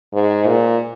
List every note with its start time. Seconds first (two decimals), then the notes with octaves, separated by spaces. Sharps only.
0.13 G#2
0.47 A#2